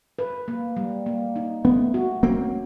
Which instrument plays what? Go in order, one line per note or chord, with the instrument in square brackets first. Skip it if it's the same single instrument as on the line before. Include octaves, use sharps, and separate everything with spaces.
[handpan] B4
A#3
G3
A#3
D#4
[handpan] A3 [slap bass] B3 C#4
[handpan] F#4
[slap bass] A#3 C4 [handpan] C#4